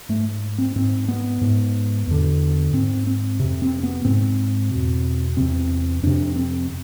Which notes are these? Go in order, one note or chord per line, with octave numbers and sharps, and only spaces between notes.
G#2 A3
C4
G#2 C4
B3
G#2
E2 D3
G#2 C4
C4
F2 C3
C4
B3
G#2 C4
E2 B2
E2 C3 C4
F2 C3 D4
C4